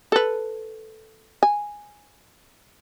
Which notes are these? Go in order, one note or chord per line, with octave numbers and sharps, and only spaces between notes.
A4 B4
G#5